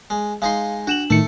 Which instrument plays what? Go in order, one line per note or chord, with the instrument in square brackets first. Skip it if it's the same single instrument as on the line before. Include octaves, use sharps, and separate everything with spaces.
[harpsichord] G#3
[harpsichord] G#3 D#4 C6 [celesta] F5
[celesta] D4 E7 F#7 [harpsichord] F#4
[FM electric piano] A2 D#3 C#7 [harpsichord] A3